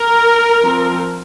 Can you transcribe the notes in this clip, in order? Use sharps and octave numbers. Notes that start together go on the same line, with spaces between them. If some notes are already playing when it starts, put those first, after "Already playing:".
Already playing: A#4
F3 C4